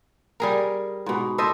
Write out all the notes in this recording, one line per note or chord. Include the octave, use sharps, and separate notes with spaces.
G3 G#4 A#4
G#2 B2
A4 C5 D#5 E5